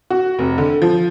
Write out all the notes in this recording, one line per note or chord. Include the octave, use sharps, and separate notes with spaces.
F#4
F1
D3
F3